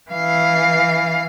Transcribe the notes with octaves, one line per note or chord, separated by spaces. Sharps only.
E3 F5